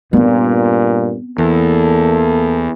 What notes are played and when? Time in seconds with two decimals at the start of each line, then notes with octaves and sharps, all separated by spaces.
0.13 G2 A#2 B3 C4
1.38 E2 A#3 A4